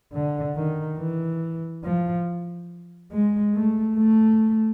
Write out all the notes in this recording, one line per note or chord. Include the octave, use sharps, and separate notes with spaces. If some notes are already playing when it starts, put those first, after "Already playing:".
D3
D#3
E3
F3
G#3
A3
A3